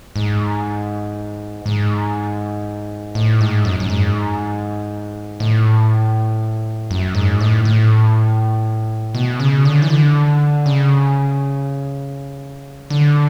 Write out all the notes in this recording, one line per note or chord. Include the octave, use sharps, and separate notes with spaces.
G#2
G#2
A2
G#2
F#2
F#2
G#2
A2
F#2
G#2
A2
A2
B2
C#3
D3
E3
D3
C#3
D3